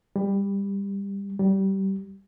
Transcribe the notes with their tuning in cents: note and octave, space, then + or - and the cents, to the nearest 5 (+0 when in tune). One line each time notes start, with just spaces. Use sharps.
G3 +20
G3 -20